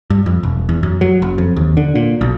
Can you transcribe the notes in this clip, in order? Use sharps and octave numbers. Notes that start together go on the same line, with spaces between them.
G2
F2
E1
E2
F#2
F#3
F#1
F2
D#2
D3
A#2
B1